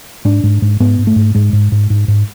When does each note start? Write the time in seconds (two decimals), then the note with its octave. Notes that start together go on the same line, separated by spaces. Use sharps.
0.25 G#2 D4
0.43 G#2
0.62 G#2
0.80 G#2 B3
0.99 G#2
1.07 A3
1.16 G#2
1.35 G#2 G#3
1.53 G#2
1.72 G#2
1.90 G#2
2.08 G#2